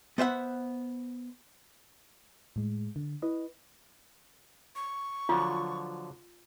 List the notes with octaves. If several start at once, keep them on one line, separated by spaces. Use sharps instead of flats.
B3 C5 E5 F#5
A2 G#3
D3
E4 B4 D#5
C#6
D3 F3 F#3 F4